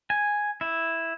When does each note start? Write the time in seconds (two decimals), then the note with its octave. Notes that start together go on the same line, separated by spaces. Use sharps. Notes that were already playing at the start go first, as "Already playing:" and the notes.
0.10 G#5
0.61 E4